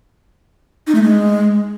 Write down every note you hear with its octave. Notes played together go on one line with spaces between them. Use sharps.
D#4
A3
G#3